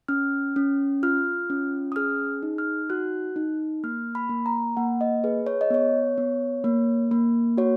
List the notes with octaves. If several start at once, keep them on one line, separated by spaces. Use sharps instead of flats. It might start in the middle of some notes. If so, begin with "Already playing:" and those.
C#4 F6
C#4
F4 F6
C#4
D#6
G#4 F6
D#4
F6
F#4 F#6
D#4
A#3 F6
B5
A#3
A#5
A#3 F#5
D#5
G#4 B4
C#5
D#5
B3 C#5
B3
A#3
A#3
F#4 C#5